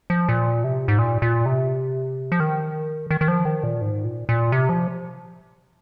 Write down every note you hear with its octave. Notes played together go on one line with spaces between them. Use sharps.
F3
A#2
C3
G#2
A#2
A#2
C3
F3
D#3
D#3
D#3
F3
D#3
A#2
G#2
A#2
A#2
C3
F3